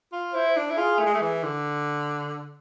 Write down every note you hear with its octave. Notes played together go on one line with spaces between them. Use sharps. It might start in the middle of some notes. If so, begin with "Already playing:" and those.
F4
E4 C5
D4
E4
F4 G#4
A3
G#3
A3
E3
D3